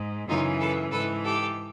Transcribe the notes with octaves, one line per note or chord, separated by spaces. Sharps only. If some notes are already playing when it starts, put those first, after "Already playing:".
Already playing: G#2
F#2 C#3 E3 D#4 F4
A4 B4
G#2 A4 B4
E3
G4 A4